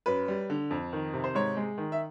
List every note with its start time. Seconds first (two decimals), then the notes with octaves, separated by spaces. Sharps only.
0.06 F#2 B4
0.28 G3
0.50 D3
0.71 F2
0.93 D#3
1.14 C3
1.24 C5
1.35 G#2 C#5
1.57 G#3
1.78 D#3
1.92 E5